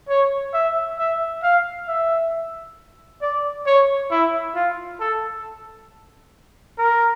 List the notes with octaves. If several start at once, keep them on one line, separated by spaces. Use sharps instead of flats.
C#5
E5
E5
F5
E5
D5
C#5
E4
F4
A4
A#4